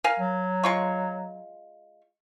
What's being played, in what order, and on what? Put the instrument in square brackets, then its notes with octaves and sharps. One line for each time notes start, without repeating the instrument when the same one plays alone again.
[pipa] A#4 F5 G#5
[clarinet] F#3
[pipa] G#3 F4 C#6